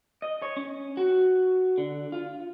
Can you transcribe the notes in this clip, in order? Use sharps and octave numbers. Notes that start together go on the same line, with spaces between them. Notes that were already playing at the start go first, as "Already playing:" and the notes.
D#5
C#5
C#4
F#4
D3
F4